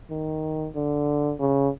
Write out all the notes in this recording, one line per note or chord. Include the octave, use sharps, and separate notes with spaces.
D#3
D3
C#3